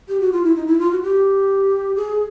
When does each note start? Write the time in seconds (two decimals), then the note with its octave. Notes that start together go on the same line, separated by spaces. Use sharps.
0.09 G4
0.20 F#4
0.32 F4
0.44 E4
0.56 D#4
0.67 E4
0.79 F4
0.91 F#4
1.02 G4
1.96 G#4